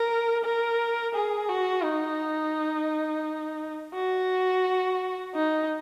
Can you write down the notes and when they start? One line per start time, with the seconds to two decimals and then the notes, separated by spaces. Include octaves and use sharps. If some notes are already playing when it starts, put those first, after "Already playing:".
Already playing: A#4
0.44 A#4
1.14 G#4
1.49 F#4
1.84 D#4
3.94 F#4
5.35 D#4